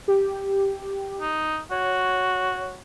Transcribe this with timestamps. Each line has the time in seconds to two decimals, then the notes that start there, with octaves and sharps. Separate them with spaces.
0.08 G4
1.21 D#4
1.71 F#4 C#5